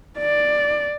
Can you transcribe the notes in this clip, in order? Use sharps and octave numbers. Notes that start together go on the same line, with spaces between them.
D5